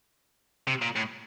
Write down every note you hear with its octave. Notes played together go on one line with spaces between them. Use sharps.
C3
A#2
A2